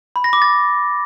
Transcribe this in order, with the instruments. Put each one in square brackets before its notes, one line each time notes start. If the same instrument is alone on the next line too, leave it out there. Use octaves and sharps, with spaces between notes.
[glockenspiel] B5
A#6
D6
A6